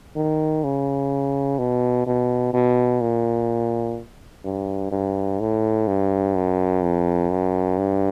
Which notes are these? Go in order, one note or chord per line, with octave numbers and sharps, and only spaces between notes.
D#3
C#3
B2
B2
B2
A#2
G2
G2
A2
G2
F#2
F2
F#2
G2